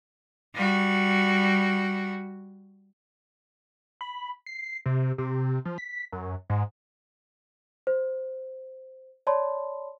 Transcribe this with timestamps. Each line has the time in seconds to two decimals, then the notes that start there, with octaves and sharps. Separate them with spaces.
0.55 G3 F#4
4.01 B5
4.46 C7
4.86 C3
5.18 C3
5.65 F3
5.78 B6
6.12 F#2
6.50 G#2
7.87 C5
9.27 C#5 D5 A5 B5 C6